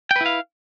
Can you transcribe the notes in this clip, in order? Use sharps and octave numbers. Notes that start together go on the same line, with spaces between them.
E4 B4 F5 G5